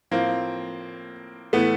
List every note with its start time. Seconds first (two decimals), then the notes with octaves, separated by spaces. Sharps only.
0.11 A2 F3 A#3 C4
1.53 A2 E3 A3 B3